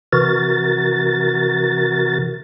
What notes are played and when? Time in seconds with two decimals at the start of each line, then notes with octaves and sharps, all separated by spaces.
0.13 C3 E3 F#4 A#4 A6